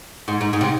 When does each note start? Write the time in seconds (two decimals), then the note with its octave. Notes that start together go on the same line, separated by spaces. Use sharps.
0.28 G#2
0.41 G#2
0.53 G#2
0.61 C3